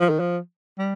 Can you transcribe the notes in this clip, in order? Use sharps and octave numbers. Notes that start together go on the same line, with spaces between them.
F3
D#3
F3
G3